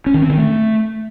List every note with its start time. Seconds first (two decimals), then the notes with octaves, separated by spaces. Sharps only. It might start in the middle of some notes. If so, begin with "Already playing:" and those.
0.06 C#4
0.14 D#3
0.22 C4
0.30 D#3
0.38 A3